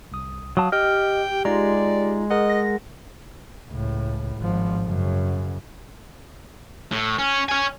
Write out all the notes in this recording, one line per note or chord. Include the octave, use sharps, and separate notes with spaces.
C2 D#6
F#3 F5 A5 D#6
G4 D#5 G5 F6
G#3 D#4 F4 D5 A#5
G#4 A#4 D#5 F#5
A#6
C#2 A2
G#1 F3
F#2 C#3
A2
C#4
C#5 G#5